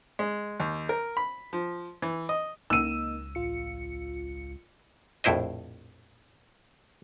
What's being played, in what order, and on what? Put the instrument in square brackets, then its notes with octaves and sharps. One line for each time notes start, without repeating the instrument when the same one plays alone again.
[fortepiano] G#3
D#2
A#4
B5
F3
E3
D#5
[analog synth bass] C#2 [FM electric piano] A#3 D#4 [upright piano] E6 D#7
[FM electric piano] A1 F4 C#7
[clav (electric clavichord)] A#1 F2 A2 E4 C5 D#5